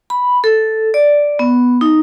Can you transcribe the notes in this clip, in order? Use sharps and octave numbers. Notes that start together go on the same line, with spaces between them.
B5
A4
D5
B3
D#4